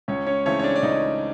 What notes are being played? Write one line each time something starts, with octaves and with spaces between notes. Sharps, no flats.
C#2 C#4 C#5
C#4 C#5
C#3 E3 A3 C4 C#4 C#5
C#5
D4 D5
D5
C#2 D#4 D#5